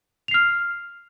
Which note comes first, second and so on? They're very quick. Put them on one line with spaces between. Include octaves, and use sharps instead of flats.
F7 C7 F6